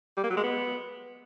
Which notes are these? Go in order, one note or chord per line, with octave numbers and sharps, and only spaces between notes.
G3
A#3
F#3
G#3
B3